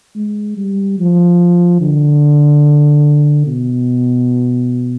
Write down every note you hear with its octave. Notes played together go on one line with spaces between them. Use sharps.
G#3
G3
F3
D3
B2